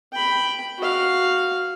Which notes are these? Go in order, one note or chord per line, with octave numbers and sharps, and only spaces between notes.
G5 B5
F#4 F5